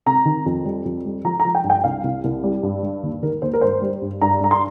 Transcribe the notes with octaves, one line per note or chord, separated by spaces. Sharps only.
C3 A#5
D#3
F2
G3
F2
G3
F3 A#5
A#5
F3
G5
G2
G5
C2 F5
C2
C2
G3
G2
G3
D#2
D#3 A#4
D#2 C5
A#4
G2 C5
G3
G2
G2 A#5
G2 A#5
C6